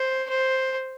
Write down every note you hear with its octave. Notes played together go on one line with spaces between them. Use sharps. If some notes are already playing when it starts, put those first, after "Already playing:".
Already playing: C5
C5